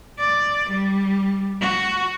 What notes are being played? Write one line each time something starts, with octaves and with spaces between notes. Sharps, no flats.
D5
G3
F#4